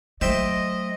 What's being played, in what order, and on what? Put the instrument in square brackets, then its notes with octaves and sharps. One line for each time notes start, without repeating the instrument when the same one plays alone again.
[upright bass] F#3 A3 [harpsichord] C5 E5 G5 [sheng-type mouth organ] D#5